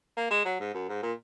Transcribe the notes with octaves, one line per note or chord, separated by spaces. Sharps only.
A#3
G#3
F#3
G#2
F#2
G#2
A#2